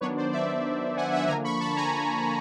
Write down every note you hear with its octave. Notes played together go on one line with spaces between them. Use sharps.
D#3 F#3 B3 D4 B4 C#5
C5 D5
D5 E5
F#5 G#5
E5 F#5
D3 F3 A#3 D4 G#5 A#5
B5 C#6
A5 B5
G#5 A#5